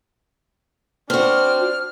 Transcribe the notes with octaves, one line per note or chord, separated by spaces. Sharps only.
C4 D4 F#4 F6